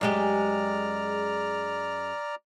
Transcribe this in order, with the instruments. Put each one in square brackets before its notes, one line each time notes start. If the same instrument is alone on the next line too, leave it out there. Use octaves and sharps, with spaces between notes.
[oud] F#2 G#3 G4 [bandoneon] D5 A#5 F6